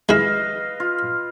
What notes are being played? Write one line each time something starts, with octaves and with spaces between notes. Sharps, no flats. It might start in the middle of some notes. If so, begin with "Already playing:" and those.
G#3 E4 B4 D#5 F5
F4